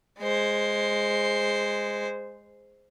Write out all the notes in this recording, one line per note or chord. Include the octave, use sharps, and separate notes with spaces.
G#3 C5